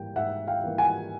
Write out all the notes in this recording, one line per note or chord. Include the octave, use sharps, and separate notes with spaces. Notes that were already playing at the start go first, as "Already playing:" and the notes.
Already playing: G#2 E3 G3 A#3 G5
G#2 E5 F#5
F5 G5
E3 G3 A#3
F#5 G#5